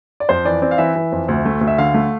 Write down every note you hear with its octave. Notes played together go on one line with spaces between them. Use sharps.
D5
F2 C5
E3 D5
C4 D5
F5
E3 E5
E3
F2
D2
A3
D2
E5
D3 F5
A3